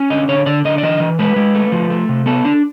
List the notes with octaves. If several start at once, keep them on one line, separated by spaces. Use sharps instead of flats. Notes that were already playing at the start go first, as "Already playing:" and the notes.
Already playing: C#4
D3 D#5
D3 C#5
D3 D5
D3 D#5
D5
E3 D#5
E3
G#3 B4
G#3
A3
F3
A3
C3
B3 A4
D4